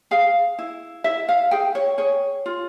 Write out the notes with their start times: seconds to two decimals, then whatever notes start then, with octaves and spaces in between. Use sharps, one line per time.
0.11 G#4 F5
0.59 E4
1.04 E4 E5
1.29 F5
1.51 G#4 G5
1.75 C#5
1.98 G#4 C#5
2.46 F4